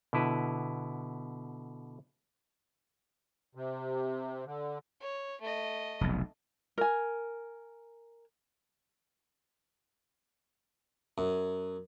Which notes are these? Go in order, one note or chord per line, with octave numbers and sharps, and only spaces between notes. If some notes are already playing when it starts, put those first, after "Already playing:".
B2 D3 E4 B4
C3
D3
C#5
A3 D#5
F1 B1
A#4 G#5
F#2